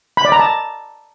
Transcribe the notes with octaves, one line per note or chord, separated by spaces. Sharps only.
B5
D5
A#5
A5